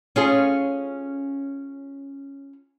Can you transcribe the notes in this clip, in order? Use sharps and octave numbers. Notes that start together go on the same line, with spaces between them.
C#4 F4 G#4